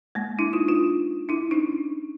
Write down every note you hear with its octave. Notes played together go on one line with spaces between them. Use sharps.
G#3 A#3
D4 E4
D#4 F4
D#4 F4
D4 E4
C#4 D#4